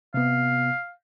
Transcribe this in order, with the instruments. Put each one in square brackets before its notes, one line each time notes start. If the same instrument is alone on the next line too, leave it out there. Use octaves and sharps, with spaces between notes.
[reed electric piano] C3 B3 [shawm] F5